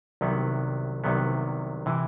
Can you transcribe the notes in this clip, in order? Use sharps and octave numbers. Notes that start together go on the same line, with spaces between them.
C2 C3 D#3 F#3 B3
C2 C3 D#3 F#3 B3
C3 E3